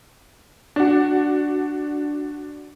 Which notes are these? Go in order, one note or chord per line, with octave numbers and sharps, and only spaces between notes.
D4 F#4